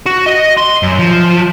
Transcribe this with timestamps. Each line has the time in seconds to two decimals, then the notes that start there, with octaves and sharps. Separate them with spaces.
0.06 F#4
0.26 D#5
0.57 C6
0.83 F#2
0.99 F3